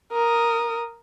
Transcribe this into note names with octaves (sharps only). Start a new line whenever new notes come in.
A#4 D#6